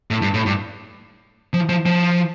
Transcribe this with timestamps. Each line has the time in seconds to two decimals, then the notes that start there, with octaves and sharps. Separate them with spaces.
0.11 A2
0.22 G2
0.34 A2
0.46 G2
1.54 F3
1.69 F3
1.86 F3